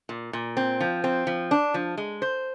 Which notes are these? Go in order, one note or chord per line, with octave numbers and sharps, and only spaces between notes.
A#2
A#2
C4
F3
C4
F3
D4
F3
G#3
C5